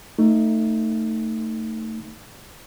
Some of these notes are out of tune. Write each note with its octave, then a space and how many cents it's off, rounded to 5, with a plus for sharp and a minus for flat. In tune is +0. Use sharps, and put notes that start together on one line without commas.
A3 +20 D#4 +0